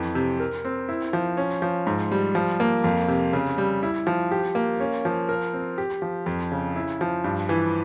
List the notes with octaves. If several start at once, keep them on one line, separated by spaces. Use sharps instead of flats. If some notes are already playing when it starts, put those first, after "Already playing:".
Already playing: F2 E3
C3
A#4
C4
E4
F3
C#4
F3
G#2
G3
F3
A#3
F2
C3
C#3
G3
E4
F3
G4
A#3
C#4
F3
A#4
C4
G4
F3
F2
C#3
E4
F3
G2
E3